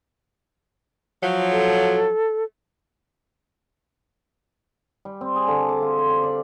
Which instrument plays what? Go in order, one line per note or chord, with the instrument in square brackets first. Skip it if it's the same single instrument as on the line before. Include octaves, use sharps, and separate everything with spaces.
[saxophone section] F3 F#3
[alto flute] A4
[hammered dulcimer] G3
C4
G#4
D3
D6
F4
C5
G4
D5